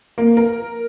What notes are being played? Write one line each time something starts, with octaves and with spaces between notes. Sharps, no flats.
A#3
A#4